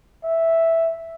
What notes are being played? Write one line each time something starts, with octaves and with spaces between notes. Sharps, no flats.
E5